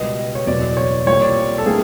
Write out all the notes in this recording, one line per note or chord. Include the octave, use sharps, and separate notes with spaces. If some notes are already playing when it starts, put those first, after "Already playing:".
Already playing: C#2 B2 G3 B3 D#5
C#5
F#1 E2 B2 D5
C#5
C2 A#2 G3 C4 C#5
D5
A4
E3 G3 A#3 D4 G#4